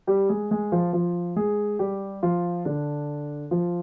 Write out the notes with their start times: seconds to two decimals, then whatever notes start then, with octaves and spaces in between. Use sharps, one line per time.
0.07 G3 G4
0.29 G#3 G#4
0.51 G#3 G#4
0.72 F3 F4
0.93 F3 F4
1.36 G#3 G#4
1.79 G3 G4
2.23 F3 F4
2.65 D3 D4
3.51 F3 F4